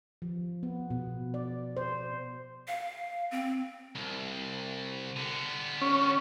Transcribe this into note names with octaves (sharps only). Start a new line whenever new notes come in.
F3
B3
B2
D5
C5
F5
C4
C2
D3 B3
C#4